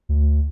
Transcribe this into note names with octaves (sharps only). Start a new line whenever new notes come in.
D2